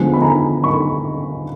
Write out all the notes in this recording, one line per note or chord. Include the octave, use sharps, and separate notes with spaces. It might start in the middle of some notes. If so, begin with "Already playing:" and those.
Already playing: D3 F3 G#3 B3 G#5
B5
G#5 A#5
B5 C#6